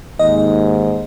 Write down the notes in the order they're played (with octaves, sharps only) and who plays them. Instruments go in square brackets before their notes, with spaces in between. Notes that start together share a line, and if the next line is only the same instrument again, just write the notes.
[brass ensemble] D#2 G#2 [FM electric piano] D#5